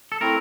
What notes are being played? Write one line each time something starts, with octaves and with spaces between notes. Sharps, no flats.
A4
A3 C4 E4 A#4